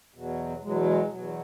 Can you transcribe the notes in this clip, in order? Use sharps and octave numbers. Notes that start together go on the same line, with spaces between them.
E2 B2 F#3
E2 B2 F#3 G#3
G#3
E2 B2 F#3